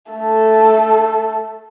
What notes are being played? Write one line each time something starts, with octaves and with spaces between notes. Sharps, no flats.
A3 A4